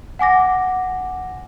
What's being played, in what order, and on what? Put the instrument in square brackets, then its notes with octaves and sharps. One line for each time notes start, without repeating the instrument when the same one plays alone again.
[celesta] F#5 G#5 D6 A#6